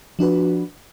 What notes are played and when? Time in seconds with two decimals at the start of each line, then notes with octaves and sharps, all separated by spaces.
0.19 F3 D4 F#4 B4